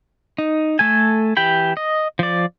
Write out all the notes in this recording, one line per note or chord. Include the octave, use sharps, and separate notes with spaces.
D#4
A3 A4 G#5
E3 G4 G5 B5
D#5
F3 D5